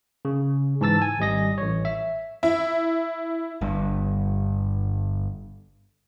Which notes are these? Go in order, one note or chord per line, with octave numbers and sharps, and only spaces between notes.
C#3
G#2 E3 A5 E6 A6
G#5
G#1 G3 D#5 A#6
A1 C#5
E5
E4
G1 G2